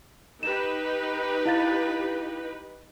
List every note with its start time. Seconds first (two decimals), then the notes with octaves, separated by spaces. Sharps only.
0.43 D#4 G4 B4 E7
1.45 E4 F5 A6